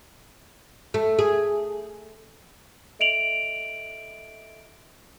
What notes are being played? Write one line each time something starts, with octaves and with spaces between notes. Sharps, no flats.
A3
G#4
A4 D#5 E5 D7 F7 F#7